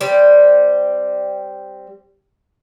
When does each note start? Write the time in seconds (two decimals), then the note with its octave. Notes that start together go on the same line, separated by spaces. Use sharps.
0.01 G3 C4